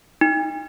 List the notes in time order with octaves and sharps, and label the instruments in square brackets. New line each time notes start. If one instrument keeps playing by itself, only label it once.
[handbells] D#4